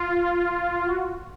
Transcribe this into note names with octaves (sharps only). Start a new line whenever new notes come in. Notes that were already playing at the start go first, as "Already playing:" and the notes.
Already playing: F4
F#4